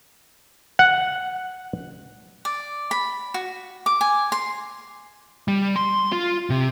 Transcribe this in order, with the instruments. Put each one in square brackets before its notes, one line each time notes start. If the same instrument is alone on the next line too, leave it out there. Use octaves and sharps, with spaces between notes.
[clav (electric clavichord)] F#5
[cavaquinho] D5
B5
F#4
D6
G#5
C6
[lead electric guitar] G3
C6
F4
C3